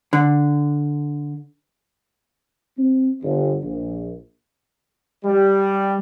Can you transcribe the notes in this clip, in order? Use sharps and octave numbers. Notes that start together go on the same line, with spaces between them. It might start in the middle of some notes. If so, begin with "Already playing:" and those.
D3
C4
G1
A#1
G3